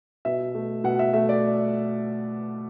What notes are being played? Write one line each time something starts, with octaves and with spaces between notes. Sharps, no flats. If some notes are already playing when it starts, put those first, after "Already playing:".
B2 E5
A3
B2 F#5
E5
A3 E5
D5